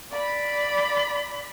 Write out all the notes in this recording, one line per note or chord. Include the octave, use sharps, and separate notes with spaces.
D5 B5